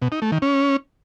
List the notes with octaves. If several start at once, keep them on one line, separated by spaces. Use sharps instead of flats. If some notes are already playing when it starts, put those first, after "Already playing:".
B2
D#4
A3
D#3
C#4